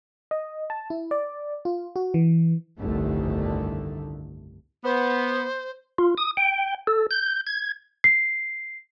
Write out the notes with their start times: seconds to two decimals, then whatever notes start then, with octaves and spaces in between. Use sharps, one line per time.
0.31 D#5
0.70 A5
0.90 E4
1.11 D5
1.65 F4
1.96 F#4
2.14 E3
2.79 G1 C2 F2 D3 D#3 A3
4.84 B3 C5
5.98 F4
6.18 D#6
6.37 G5
6.87 A4
7.11 G6
7.47 G#6
8.04 C7